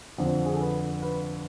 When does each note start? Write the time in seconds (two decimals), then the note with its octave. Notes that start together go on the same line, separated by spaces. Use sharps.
0.18 F2 D3 C5
0.45 G#4
0.53 A4
0.61 B4
1.02 B4